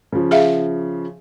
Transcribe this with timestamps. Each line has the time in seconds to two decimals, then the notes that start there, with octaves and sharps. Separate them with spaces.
0.12 C#3 F3
0.31 G#4 E5 F5